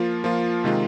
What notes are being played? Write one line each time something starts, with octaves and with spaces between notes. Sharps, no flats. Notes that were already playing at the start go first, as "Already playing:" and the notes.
Already playing: F3 A#3 F4
F3 A#3 F4
C3 D#3 G#3 F4